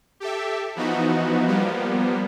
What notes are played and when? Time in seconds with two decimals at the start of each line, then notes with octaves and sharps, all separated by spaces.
0.20 G4 A4 E5
0.76 E3 F3 B3 D#4 F#4
1.47 F3 G3 A#3 B3